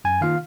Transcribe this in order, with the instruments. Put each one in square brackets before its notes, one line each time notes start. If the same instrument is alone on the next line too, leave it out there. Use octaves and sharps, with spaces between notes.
[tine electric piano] F#2 G#5
D#3 A#3 F4 F5